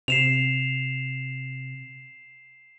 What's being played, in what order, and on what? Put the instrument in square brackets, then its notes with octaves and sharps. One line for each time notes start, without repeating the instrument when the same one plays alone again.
[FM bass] C3 [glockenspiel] C7 E7 F7